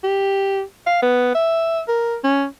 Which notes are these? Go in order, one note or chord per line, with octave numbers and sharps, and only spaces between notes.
G4
F5
B3
E5
A#4
C#4